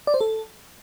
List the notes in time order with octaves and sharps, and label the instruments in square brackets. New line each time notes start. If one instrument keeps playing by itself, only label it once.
[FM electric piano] D5
C5
A4